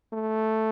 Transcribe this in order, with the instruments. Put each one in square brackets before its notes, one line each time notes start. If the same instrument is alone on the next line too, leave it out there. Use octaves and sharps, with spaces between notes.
[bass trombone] A3